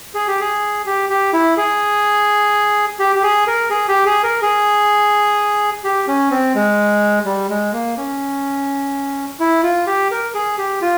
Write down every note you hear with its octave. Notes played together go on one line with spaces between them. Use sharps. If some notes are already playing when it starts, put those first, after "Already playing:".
G#4
G4
G#4
G4
G4
E4
G#4
G4
G4
G#4
A#4
G#4
G4
G#4
A#4
G#4
G4
C#4
C4
G#3
G3
G#3
A#3
C#4
E4
F4
G4
A#4
G#4
G4
F4